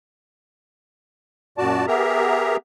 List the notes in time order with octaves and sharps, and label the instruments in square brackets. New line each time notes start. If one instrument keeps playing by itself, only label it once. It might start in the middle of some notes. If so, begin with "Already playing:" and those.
[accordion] F#2 A#2 F#4 D5 A5
B3 G4 G#4 A#4 E5 A#5